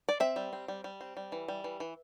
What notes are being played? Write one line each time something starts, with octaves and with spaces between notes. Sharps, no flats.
D5
C4 E5
G3
C4
G3
G3
C4
G3
E3
G3
E3
E3